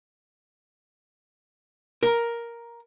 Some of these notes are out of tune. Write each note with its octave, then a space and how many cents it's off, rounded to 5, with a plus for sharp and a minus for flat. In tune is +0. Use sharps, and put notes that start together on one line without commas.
A#4 +5